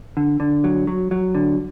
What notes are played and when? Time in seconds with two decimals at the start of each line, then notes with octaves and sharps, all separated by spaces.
0.17 D3
0.40 D3
0.64 F#3
0.87 F#3
1.11 F#3
1.35 D3